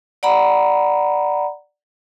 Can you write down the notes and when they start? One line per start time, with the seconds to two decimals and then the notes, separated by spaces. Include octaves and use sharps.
0.23 D5 F#5 A#5 B5